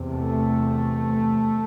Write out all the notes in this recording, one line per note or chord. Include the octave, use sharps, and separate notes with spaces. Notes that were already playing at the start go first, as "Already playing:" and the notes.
Already playing: E2 C3
A3